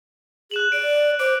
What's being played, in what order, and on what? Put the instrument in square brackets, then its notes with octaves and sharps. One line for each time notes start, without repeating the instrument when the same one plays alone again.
[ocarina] G#4 [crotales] F#6 E7 F#7
[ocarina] D5 [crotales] D7
[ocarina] C5 [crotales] D6 D7